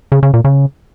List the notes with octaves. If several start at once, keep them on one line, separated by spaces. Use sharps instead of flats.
C#3
C#3
A#2
C#3